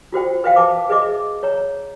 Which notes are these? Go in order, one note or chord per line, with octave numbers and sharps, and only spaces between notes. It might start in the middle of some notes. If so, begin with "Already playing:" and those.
F4 F#4 C5 G5
B4 C5 E5 F5 G5
B4 A5 D6
G#4 B4 D#5 E5 D6
C#5 A#5